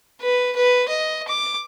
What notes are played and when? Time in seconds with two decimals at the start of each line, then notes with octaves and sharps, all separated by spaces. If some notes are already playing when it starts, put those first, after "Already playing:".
0.21 B4
0.56 B4
0.88 D#5
1.28 D6